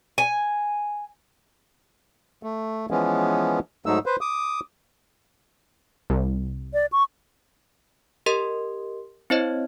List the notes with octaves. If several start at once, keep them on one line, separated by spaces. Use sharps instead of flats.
G#5
A3
E3 F3 G#3 B3 C#4
G#2 F#3 A3 D#4 E6
B4 C5
D6 D#6
C2
D5
C#6
G4 A#4 D#5 C6
C4 E4 C5 C#5 D#5